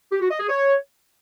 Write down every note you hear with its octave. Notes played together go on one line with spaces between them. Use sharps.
G4
F#4
D#5
G#4
C#5